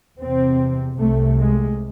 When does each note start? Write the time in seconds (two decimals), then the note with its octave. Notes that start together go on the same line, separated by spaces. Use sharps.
0.19 E2 C3 C4
0.98 C2 C3 A3
1.38 G#3